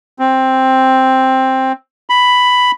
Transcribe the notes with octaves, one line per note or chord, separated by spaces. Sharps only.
C4
B5